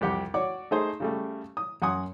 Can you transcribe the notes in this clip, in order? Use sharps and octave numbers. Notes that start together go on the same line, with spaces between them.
C2 F2 G4 F#5 D6
F#4 C#5 D5 D6
A3 D#4 G#4 C5
C#3 G3 A3
D#6
F#2 F#5 G#5 C6 D#6